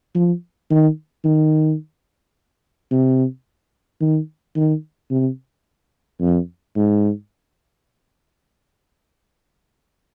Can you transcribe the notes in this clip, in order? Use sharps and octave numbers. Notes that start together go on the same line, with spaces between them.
F3
D#3
D#3
C3
D#3
D#3
C3
F2
G#2